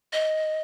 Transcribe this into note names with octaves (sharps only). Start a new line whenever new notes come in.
D#5